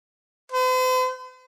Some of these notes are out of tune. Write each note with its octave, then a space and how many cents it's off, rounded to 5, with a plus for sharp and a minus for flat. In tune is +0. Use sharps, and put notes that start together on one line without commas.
C5 -45